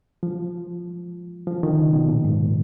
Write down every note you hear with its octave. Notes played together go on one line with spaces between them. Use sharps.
F3
F3
D#3
C#3
B2
A#2
G#2